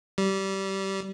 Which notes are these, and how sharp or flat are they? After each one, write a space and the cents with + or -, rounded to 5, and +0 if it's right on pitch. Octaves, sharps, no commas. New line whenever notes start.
G3 -20